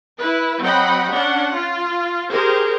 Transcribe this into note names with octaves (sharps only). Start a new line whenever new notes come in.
E4 B4
F#3 C4 D#5 F#5 G5 B5
C#4 D4 F#5
F4
G4 G#4 A#4 C5